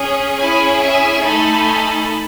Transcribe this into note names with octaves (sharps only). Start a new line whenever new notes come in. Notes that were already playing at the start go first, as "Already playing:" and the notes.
Already playing: C#4 G#4
C#4 E4 G#4 G#5 B5
E5 G#5
A3 D#4 A4 G#5 B5